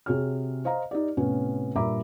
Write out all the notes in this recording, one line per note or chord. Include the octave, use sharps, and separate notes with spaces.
C3 F#4 G#4 C#5 F6
C5 D#5 F5 A#5
D#4 G4 D5
A2 C3 B3 C#4
G2 A#2 E5 A#5 B5 D6